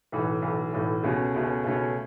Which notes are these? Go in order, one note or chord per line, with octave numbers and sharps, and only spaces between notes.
B1 A2 E3
B1 A2 E3
B1 A2 E3
C#2 B2 A3 C#4
C#2 B2 A3 C#4
C#2 B2 A3 C#4